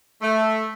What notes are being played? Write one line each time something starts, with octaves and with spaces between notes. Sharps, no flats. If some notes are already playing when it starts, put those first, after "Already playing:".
A3